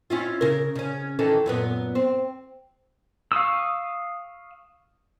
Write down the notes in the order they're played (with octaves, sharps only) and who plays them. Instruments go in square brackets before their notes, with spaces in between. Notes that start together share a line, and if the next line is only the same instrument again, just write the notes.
[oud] C#4 E4 F4
C#3 A#4
C#3 C#4
D#3 E3 A4
F#2 A#2 B3
C4
[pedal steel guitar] F5 C#6 D#6 E6